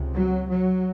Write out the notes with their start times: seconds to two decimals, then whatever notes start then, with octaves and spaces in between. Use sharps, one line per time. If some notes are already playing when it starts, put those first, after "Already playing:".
Already playing: C#2 C3
0.16 F#3
0.50 F#3